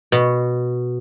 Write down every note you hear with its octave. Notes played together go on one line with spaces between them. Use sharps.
B2